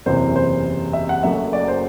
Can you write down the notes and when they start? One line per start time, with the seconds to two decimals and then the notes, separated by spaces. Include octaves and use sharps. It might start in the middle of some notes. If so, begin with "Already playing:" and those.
0.06 F#1 E2 C3 E3 C5
0.36 C5
0.93 E5
1.09 F#5
1.23 F#1 F#2 F#3 A3 E5
1.53 D5
1.68 C5